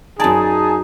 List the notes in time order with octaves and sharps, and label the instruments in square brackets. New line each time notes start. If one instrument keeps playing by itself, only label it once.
[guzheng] F#2 D5 [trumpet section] D#4 G#4 [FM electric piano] G#5 A5